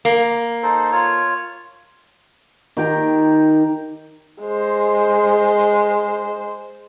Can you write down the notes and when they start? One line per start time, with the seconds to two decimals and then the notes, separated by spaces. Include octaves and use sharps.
0.05 A#3
0.63 D#4 A4 C5
0.92 F4 C#5
2.77 D#3 G4 G5 A#5
4.42 G#3 C5